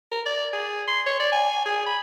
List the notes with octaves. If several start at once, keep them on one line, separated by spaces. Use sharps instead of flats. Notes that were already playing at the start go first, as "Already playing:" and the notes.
A#4
D5
G#4
C6
C#5
D5
G#5
G#4
B5